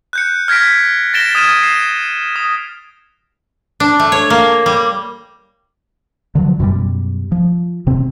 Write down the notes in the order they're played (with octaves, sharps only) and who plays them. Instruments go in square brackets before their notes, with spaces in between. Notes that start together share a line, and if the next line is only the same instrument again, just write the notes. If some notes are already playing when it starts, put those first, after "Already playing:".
[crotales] F#6 G6 C#7
F6 G#6 A#6 B6 D7
A6 A#6 D7 E7 G7
D#6 F6 G#6 A6 D#7 E7
C7 D7 E7
D#6
[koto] D4
A3
C#5
A#3
G3
[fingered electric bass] D3 F3 F#3
F#2 B2 G3
F3
C3 C4